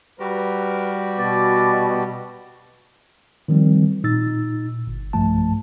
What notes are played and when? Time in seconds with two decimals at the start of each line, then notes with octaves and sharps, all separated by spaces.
0.20 G3 F#4 G4 A#4 B4
1.19 B2 B3 D5
3.48 D#3 F3 G3 C4
4.04 A#2 D#4 E6 A6
4.87 G1
5.13 B1 G2 F3 A3 A5